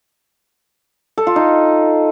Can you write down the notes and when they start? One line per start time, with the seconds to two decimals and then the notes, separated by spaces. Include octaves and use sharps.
1.18 A4
1.27 F4
1.36 D#4